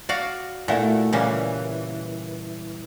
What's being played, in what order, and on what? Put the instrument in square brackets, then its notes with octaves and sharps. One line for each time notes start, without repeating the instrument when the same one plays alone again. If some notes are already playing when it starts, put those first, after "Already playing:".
[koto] F#4 D5 F5
[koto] A#2 [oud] A3 E4 F#4
[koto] A#2 C#3 A#3 [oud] E3 G3